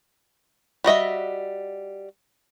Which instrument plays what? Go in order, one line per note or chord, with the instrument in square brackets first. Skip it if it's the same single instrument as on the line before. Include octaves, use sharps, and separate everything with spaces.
[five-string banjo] G3 F#4 D#5 E5